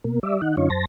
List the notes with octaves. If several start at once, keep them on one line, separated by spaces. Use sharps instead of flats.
B2 A#3
G3 D5 E5
D#3 D#4 F#5
F#2 D3 C#4 D#4 F4 C#5
F#2 C5 A5 A#6